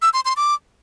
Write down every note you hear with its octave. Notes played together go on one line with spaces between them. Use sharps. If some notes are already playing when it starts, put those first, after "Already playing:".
E6
C6
C6
D6